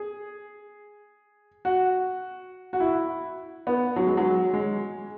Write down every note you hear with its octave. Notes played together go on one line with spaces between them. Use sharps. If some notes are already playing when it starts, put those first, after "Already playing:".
Already playing: G#4
F#4
F#4
E4
B3
F#3
G#3
F#3
G#3